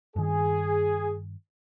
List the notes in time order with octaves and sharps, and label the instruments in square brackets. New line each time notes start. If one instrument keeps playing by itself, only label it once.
[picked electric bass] G2 D#3 [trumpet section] G#4